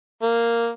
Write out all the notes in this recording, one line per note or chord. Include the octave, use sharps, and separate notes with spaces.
A#3